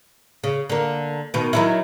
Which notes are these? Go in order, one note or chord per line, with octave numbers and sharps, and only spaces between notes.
C#3
D3 A#3
B2 D#3
D#3 F#3 E4